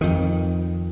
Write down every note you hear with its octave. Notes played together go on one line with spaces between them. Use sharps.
F2 D#3